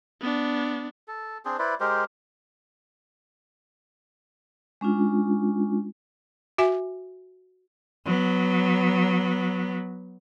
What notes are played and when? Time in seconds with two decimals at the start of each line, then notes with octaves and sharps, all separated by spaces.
0.21 B3 D4
1.08 A4
1.45 C4 D4 G#4 C5
1.59 E4 B4 C5 D5
1.80 G#3 G4 A#4 C5
4.81 G#3 C#4 D4 F4
6.58 F#4 E5 G#5
8.05 F#3 B3